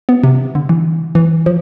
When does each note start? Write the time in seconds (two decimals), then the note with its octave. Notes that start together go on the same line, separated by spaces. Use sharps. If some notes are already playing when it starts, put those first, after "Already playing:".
0.09 B3
0.24 C3
0.55 D3
0.69 E3
1.15 E3
1.46 F3